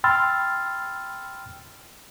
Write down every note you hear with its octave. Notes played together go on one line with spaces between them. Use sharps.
G5 B5 C6 E6 F6 A6